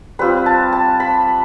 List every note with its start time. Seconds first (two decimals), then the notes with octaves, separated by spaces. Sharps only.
0.19 G3 C4 F4 B4
0.46 A5
0.73 A5
1.00 B5